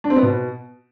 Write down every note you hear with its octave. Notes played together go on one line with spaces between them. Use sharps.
D4
C4
B3
B2